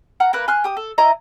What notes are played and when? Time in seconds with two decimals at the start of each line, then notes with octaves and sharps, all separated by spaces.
0.20 F#5 A#5 F6
0.33 A#3 A#4 B4 F#6
0.48 G#5 C6 F6 F#6
0.64 G4 D#6
0.77 A4
0.98 E4 D#5 A#5